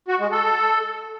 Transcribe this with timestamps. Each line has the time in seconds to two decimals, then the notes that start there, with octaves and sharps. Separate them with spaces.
0.08 F#4
0.20 G#3
0.31 A4